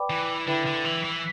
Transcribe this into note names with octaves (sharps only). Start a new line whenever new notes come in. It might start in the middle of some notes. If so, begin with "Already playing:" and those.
Already playing: B4 D5 G5 B5 D6
E3
D3 E4 B4 E5 G5 B5
D3
E3
E3